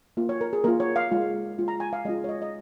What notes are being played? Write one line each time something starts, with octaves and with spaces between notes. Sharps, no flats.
A#3 F4
C#5
A#4
G#4
A#3 F4 A#4
C#5
F5
G#3 F4
G#3 F4
A#5
G#5
F5
G#3 C#4 F4 D#5
C#5
D#5
D#5